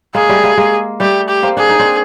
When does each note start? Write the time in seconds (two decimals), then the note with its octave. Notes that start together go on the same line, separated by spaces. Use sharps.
0.15 G#3 A#3 G#4
0.29 G3 A3
0.43 G#3 A#3
0.58 G#3 A#3
1.00 G3 A3 G4
1.29 G4
1.43 A#3 C4
1.57 D4 G#4
1.69 D#4
1.79 C4 D4